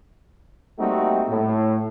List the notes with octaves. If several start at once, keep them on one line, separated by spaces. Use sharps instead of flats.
G3 A3 A#3 C4 D#4 F#4
A2